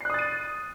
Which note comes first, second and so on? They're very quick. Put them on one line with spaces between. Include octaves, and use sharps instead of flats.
C7 F#6 D#6 A6 D#7